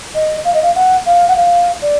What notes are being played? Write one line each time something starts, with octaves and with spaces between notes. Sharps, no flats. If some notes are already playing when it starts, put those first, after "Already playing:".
D#5
F5
D#5
F5
F#5
F5
F#5
F5
D5